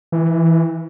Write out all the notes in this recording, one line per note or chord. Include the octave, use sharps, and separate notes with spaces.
E3